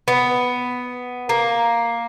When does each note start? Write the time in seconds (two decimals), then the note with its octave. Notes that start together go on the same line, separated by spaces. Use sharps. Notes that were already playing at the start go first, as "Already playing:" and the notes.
0.08 B3
1.29 A#3